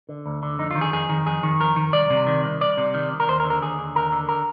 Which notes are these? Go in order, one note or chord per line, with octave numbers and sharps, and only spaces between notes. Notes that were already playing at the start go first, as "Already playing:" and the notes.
D3
D2
D3
F2 D#4
F4
D#3
G#4
F2 G#4
D#3
F2 G#4
D#3
F2 A#4
D#3
C2 D5
C3
D#3
C2
C2 D5
C3
D#3
C2
A#4
D#2 C5
A#4
D3
A#4
D#2 G#4
D3
D#2 A#4
D3
A#4